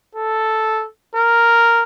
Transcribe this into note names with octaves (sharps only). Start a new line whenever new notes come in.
A4
A#4